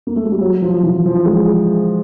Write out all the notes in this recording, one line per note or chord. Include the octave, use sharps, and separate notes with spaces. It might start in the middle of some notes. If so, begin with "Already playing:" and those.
A#3
A3
G#3
G3
F#3
F3
E3
F3
G#3